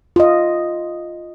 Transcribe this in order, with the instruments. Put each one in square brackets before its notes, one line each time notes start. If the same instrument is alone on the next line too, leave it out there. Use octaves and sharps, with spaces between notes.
[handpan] F4 D#5